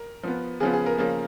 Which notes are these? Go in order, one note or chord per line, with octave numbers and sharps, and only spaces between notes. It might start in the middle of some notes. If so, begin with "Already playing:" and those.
Already playing: A#4
F3 B3
C#3 F3 B3 G#4
G#4
A#4
C#3 F3 A#3